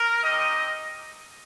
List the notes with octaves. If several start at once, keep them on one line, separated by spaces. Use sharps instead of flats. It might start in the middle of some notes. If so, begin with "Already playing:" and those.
Already playing: A#4
C4 D#4 G4 D#5